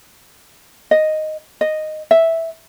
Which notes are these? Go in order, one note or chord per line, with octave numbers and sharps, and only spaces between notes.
D#5
D#5
E5